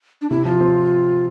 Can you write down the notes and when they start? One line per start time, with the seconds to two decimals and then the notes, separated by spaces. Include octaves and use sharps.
0.22 D4
0.30 C3 E4
0.45 F3 F4
0.61 C4